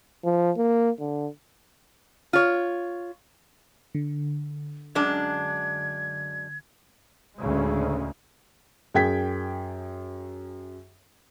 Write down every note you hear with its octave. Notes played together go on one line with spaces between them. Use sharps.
F3
A#3
D3
F4 C#5
D3
F#2 G#3 D4 G#6
D2 A2 C#3 G#3
F#2 G#4 G5 G#6 B6